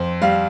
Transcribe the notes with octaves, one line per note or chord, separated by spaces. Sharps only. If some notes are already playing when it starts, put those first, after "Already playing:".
Already playing: F2 C5
G3 F5